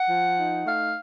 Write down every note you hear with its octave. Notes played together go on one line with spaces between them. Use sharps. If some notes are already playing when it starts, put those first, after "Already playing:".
Already playing: F#5
F3
D#4
A3 F5